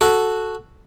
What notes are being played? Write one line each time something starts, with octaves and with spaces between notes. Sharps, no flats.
F#4 A4